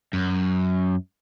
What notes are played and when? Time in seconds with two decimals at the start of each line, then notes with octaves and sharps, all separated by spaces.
0.13 F#2